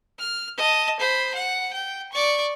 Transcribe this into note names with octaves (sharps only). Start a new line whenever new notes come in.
F6
D#5 A5
C5 B5
F#5
G5
D5 C#6